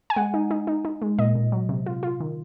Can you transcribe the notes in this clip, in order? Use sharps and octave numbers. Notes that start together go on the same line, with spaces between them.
G#5
G#3 F#5
D#4
D#4
D#4
D#4
G#3
A#2 D#5
A#2
F#3
C3
F4
F4
D#3